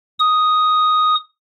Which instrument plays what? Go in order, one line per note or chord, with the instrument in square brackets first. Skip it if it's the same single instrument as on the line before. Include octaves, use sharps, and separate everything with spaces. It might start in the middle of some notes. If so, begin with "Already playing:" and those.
[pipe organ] D#6